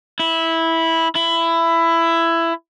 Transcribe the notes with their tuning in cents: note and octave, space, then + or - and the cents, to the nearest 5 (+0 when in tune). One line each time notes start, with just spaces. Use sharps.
E4 -10
E4 +15